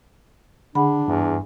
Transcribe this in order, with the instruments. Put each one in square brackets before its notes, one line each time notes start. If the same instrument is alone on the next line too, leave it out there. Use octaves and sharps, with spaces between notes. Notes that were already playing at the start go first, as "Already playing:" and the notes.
[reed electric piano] D3 [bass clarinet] D4 [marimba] G#4 F#5 B5
[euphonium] E2 [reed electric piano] G2